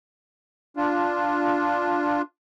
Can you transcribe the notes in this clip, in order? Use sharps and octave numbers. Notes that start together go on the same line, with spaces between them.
D4 F4